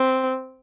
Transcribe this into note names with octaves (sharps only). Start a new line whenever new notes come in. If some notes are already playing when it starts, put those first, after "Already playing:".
Already playing: C4